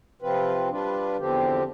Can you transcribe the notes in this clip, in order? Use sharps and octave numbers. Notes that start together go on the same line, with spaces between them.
C3 F3 C4 F4 B4
G3 D4 F4 B4
E2 D3 F3 C4 G4